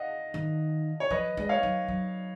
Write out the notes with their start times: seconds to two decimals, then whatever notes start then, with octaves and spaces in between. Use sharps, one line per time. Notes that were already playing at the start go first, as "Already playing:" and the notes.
Already playing: D#5 F5 F#5
0.34 D#3
1.00 C#5
1.10 F3 B4 D#5
1.37 G#3 D#5
1.49 C#5 F5
1.63 F#3
1.88 F#3